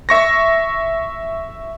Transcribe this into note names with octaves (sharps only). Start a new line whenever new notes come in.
E5 C#6 A#6